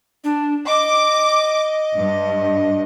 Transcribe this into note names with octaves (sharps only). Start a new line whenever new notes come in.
D4
D#5 D6
G2